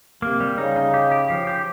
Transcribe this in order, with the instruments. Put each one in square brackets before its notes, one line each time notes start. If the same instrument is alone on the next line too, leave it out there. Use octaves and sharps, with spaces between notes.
[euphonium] C3 [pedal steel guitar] A#3
[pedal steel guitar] G3
[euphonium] C#3 [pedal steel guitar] D#4
[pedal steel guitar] D#4
G4
G4
F3
G4